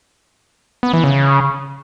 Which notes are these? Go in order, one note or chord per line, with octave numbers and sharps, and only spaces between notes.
B3
E3
C#3